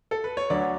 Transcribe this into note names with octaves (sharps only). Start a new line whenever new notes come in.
A4
B4
C#5
D2 D3 F#3 D5